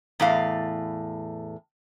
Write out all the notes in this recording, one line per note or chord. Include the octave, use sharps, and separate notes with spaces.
E2 A2 F5